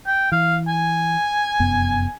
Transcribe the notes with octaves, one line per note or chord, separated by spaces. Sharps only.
G5
E3 F5
G#5
F1 F#2 B3